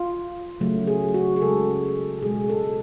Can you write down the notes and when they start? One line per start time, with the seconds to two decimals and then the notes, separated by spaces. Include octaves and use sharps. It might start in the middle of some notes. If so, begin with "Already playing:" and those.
Already playing: F4
0.60 C#3 F#3 A3
0.87 G#4
1.14 F#4
1.36 G#4
1.41 C#3 G#3 A4
2.22 B2 G#3 G#4
2.50 A4